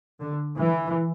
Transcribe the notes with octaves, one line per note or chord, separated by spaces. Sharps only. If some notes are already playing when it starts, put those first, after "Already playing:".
D3
E3